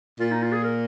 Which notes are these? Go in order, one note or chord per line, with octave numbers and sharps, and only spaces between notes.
A#2 F4
D#4
F4
G#4
A#4